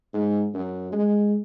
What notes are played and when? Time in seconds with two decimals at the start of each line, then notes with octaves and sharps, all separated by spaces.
0.13 G#2
0.54 F#2
0.92 G#3